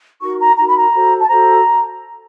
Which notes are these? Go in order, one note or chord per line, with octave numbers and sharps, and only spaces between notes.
D#4 F#4 A#4 C#6
A#5
D#4 F#4 A#4 A#5
B5
A#5
F#4 A4 C5
A5
F#4 A4 C5 A#5